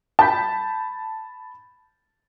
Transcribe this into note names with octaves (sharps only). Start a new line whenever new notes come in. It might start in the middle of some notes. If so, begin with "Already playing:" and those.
A5 B5 G6 B6